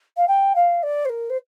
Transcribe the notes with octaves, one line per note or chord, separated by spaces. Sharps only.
F5
G5
F5
D5
C5
A#4
C5